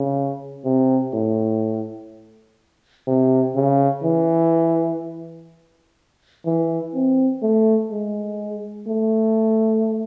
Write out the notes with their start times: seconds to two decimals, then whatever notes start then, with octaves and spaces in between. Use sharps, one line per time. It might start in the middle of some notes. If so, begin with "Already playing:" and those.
Already playing: C#3
0.65 C3
1.14 A2
3.07 C3
3.56 C#3
4.04 E3
6.46 E3
6.94 C4
7.42 A3
7.91 G#3
8.87 A3